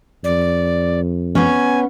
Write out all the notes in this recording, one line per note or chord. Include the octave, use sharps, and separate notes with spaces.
F2 D5
B3 C#4 G#5